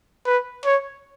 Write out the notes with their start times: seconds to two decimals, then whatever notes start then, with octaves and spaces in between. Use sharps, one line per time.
0.26 B4
0.65 C#5